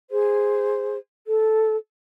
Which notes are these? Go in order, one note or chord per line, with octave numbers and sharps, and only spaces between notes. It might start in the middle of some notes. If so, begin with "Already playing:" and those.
G#4 C5
A4